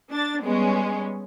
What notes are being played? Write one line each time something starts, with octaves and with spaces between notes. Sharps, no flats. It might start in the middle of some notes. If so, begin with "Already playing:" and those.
D4 A6
G3 G#3 B3 C#4